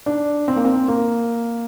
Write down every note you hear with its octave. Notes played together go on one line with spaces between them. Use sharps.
D4
C4
A#3
C4
A#3